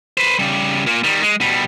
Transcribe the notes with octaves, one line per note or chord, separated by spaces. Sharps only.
B4 C5
C#3 G3
A#2 A#3
D#3 G3
G#3
B2 G3